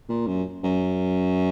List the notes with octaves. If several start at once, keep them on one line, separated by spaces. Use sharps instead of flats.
A#2
F#2
F#2